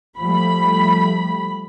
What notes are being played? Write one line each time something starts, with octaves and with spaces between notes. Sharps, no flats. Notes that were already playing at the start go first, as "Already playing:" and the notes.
F3 G3 A3 B5